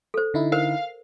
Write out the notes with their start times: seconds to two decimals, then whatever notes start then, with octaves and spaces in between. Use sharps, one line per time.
0.14 A4 C5
0.34 D3 D#4 E4
0.52 A#4 C5 F5